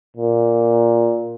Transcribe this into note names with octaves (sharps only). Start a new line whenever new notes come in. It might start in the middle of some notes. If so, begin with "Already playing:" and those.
A#2